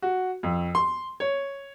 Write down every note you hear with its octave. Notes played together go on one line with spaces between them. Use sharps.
F#4
F2
C6
C#5